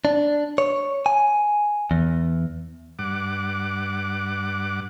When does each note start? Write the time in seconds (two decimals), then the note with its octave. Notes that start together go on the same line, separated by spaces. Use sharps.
0.05 D4
0.58 C#5
1.06 G#5
1.91 E2
2.99 G2 F#5 D6